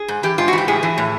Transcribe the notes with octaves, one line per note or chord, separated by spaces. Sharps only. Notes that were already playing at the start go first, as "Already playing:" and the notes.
Already playing: G#4
G#2
E3 G4
G#2 F4
F#4
E3 G4
A2 G#4
E3
A2